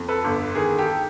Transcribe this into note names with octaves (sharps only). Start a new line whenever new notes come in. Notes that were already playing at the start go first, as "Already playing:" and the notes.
Already playing: F2
A4 B4
G1
D#3 G#4 A#4
G4 A4